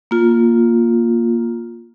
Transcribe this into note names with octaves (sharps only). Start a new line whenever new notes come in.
A#3 F4